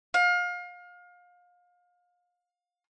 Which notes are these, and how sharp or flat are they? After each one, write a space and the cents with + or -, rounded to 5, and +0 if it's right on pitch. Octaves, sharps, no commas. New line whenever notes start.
F5 +30